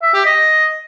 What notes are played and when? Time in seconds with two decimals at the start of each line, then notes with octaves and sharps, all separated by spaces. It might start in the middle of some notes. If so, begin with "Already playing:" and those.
0.02 E5
0.14 G4
0.25 D#5